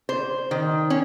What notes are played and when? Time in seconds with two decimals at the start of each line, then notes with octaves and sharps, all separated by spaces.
0.09 C5
0.51 D#3
0.90 C#4